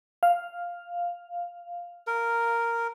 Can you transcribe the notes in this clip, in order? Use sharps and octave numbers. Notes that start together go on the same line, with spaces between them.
F5
A#4